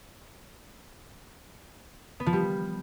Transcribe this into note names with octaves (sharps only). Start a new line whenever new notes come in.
B3
F3
G3